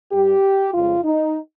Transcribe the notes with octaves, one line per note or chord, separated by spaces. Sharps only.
G2 G3 G4
F2 C#3 F3 G#3 F4
D#4